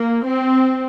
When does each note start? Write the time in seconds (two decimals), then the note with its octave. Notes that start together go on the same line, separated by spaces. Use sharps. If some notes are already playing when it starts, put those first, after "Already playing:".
Already playing: A#3
0.25 C4